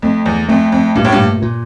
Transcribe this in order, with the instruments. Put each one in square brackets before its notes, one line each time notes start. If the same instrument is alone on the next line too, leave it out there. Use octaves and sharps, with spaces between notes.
[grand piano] F2 [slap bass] A3
[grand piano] E2
[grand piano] F2 [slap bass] A3
[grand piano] F2
[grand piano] G2 [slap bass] A#2
[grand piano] A2
G2
[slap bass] A#2